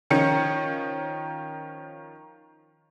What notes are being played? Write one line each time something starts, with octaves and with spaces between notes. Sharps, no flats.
D#3 F3 C#4 C#7